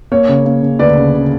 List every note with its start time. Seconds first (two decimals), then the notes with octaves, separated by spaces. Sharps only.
0.12 A#3 C#5
0.29 C#3
0.45 A#3
0.62 C#3
0.79 D2 B4 D5
0.97 C#3
1.14 C#3